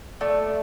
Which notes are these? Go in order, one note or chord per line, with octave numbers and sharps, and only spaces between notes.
A3 D5